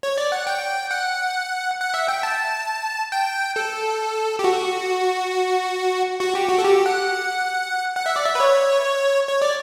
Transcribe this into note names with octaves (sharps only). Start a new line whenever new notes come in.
C#5
D5
F#5
G5
F#5
F#5
E5
G5
A5
G5
A4
G4
F#4
F#4
G4
F#4
A4
G4
F#5
F#5
E5
D5
E5
B4
C#5
C#5
D5